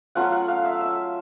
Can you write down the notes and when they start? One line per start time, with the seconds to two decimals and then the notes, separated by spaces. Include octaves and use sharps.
0.15 F#3 A3 C#4 F4 F#5
0.32 F#5
0.48 F5
0.65 E5
0.81 E5